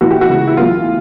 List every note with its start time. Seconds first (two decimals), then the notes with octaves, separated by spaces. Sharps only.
0.01 A#1 A2 E3 F#4
0.11 G4
0.21 F#4
0.29 C#2 C#3 E3
0.47 E4
0.57 B1 A2 E3 F4